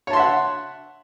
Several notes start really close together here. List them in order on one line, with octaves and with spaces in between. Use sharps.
C#5 A5 C6 E5 F#5